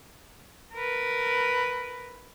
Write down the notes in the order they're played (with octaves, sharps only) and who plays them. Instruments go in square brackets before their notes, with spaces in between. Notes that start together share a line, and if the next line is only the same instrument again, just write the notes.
[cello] A#4 B4